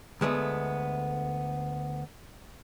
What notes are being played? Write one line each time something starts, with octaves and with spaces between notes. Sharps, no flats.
D2 G#3 A3 B3